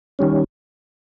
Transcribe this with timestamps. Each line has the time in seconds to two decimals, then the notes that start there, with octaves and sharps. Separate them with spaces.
0.19 D#3 G3 C#4